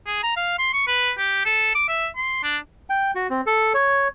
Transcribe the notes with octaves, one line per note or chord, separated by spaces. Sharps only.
G#4
A#5
F5
C6
C#6
B4
G4
A4
D6
E5
C6
D4
G5
F#4
C4
A4
C#5